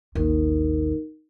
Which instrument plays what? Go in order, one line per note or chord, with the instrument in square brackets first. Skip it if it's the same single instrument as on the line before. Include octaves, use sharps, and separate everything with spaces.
[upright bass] A1 D#2 [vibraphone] D#4 A#4